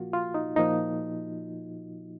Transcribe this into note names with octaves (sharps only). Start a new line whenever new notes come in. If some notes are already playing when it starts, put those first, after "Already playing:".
Already playing: A#2 F3 A#3 F4 F#4
F4
D#4
A#2 F3 A#3 D#4